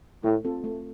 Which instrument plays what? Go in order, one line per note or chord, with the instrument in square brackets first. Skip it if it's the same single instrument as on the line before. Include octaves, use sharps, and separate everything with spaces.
[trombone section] A2 [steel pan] A3
[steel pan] C4 F4 A4
A3